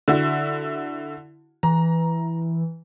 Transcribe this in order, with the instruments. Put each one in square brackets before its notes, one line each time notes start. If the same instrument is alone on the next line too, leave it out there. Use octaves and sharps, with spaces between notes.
[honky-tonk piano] D3 E4 F#4
[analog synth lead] E3 [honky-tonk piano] A#5